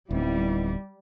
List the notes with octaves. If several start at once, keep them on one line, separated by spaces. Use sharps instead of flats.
D1 G3 B3 C4 D#4 E4